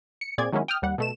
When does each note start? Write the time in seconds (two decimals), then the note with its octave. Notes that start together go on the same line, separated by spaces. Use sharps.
0.21 C#7
0.38 A#2 C4 G#4 D5 G#6
0.52 D#3 F#3 G#3 A#3 C#4 E4
0.68 G5 D#6 F6
0.82 D#2 G3 F#5
0.98 B2 A3 E7